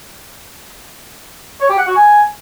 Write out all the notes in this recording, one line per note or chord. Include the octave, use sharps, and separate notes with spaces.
C#5
G4
F#5
F#4
G#5